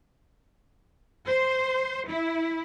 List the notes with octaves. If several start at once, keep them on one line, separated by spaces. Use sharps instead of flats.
C5
E4